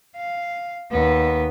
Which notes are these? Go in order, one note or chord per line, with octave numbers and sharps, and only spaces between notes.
F5
D#2 B3